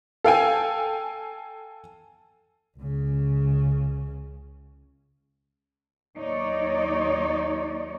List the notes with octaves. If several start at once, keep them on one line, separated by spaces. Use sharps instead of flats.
A4 F5 G5 G#5
C#2 C#3
D#2 F#3 D#4 C#5 D5